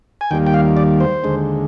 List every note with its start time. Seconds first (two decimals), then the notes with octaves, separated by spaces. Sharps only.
0.21 G#5
0.31 D#2 D#3 G3 A#3 G5
0.47 G5
0.54 F5
0.77 D5
1.00 C5
1.24 D#2 D3 G#3